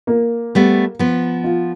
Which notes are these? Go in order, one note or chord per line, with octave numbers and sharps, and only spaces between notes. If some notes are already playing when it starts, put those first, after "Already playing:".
A#3
G3 A3 B3
F3 B3
F4